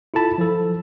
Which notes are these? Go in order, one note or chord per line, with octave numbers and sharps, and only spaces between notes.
E4 F4 A4 A5 B5
F3 A4